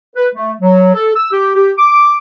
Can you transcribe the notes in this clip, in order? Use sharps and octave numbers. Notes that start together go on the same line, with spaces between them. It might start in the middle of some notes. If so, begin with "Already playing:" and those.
B4
A3
F#3
A4
E6
G4
G4
D6